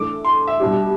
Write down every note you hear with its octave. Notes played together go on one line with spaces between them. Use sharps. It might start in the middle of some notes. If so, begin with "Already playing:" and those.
Already playing: E3 A3 D4 A4 D6
C6
E5
B2 G3 D4 G4